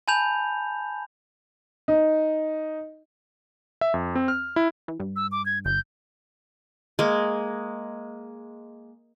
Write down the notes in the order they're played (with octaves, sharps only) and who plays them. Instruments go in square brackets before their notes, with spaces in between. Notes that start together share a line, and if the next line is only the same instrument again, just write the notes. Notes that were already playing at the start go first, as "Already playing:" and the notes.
[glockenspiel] G#5 A5 B5 G6 F7
[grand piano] D#4
[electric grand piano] E5
F2
C4
F6
E4
[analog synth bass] E3
G2
[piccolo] E6
D6
G#6
[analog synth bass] G1 [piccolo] G6
[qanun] G#3 A#3